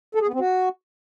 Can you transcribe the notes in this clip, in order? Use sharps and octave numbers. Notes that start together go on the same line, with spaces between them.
A4
G#4
B3
C4
F#4